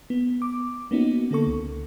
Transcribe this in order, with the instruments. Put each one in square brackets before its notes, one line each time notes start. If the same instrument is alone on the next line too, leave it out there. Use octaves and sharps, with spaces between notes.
[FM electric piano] B3
D6
A#3 B3 C#4 D#4 F#4
D3 A#3 A4 C#6
C#2